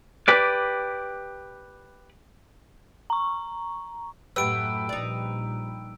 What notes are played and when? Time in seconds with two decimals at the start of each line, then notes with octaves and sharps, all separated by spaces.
0.28 G4 B4 D5
3.10 A#5 C#6
4.36 F#2 A2 G4 B4 E6 D7
4.89 A#1 A#2 G3 D#4 D5